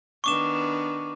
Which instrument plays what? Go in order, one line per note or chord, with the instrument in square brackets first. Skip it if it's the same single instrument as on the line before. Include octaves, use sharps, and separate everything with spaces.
[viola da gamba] D#3 B3 D4 [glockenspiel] C#6 D6 E7